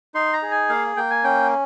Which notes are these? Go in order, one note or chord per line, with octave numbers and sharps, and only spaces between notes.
D#4 C6
A#5
G#4
G#5
A#3 F5
A#3 G5
G#5
C#4 G5